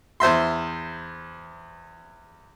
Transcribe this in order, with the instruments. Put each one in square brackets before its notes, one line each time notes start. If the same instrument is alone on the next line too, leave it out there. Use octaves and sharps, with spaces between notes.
[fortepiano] E2 C5 E5 C6